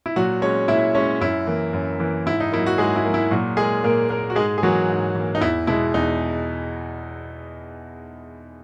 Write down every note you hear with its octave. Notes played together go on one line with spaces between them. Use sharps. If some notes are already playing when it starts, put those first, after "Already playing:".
E4
A#2 F#3 F#4
G#3 C#4 C#5
A#2 E4 E5
G#3 C#4 C#5
F#2 E4
E3 A#3
F#2
E3 A#3
G#2 E4
D#4
F#3 A#3 E4
F#4
G#2 G#3 G#4
E4
F#3 A#3
E4
A#2 F#3 F#4
G#3 A#3 G#4
A#2 A#3 A#4
A#3 A#4
F#4
G#2 G#3 G#4
G#4
E3 F#3 A#3 F#4
G#2
E3 A#3
D#4
E2 E4
B2 G#3 E4
E2 D#4